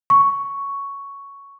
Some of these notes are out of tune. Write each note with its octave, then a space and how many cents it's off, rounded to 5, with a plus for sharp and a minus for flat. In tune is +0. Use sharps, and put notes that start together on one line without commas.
C#6 +5